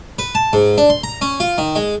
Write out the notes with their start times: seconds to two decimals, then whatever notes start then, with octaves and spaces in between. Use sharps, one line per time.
0.19 B4
0.35 A5
0.53 G#2
0.78 D4
0.90 C6
1.04 A#5
1.21 C#4
1.40 F4
1.58 D#3
1.76 G#3